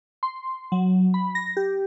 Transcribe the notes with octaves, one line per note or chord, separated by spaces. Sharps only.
C6
F#3
B5
A#6
G4